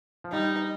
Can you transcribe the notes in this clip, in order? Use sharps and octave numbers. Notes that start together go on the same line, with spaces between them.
F3
G3 D#4